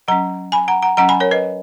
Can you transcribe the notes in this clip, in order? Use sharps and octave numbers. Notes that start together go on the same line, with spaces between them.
F#3 C#4 F#5 A#5
G#5 B5
F#5 A#5
F#5 A#5
F#3 C#4 F#5 A#5
G#5 B5
A#4 C#5
B4 D#5